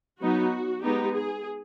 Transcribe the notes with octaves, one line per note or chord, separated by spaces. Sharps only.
F#3 B3 D#4 F#4
G#3 B3 D#4 G4
G#4